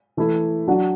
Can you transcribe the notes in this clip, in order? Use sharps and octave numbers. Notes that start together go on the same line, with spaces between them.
E3 A3 E4
F#3 D4 F#4